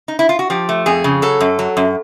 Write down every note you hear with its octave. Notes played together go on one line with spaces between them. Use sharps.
D#4
E4
F4
F#4
F3 G4
A3
F2 G#4
C#3
F#3 A4
F#2
F#3
F#2